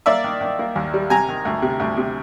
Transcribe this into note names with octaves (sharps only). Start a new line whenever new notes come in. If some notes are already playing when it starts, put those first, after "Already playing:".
A#3 D5 E5
D#3
D#3
A#3
D#2
G3
C3 G#5 A#5
D#3
D2
C3
D2
C3